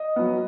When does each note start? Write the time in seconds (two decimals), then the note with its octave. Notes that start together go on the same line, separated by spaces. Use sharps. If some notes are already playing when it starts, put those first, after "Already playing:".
Already playing: D#5
0.16 F#3 B3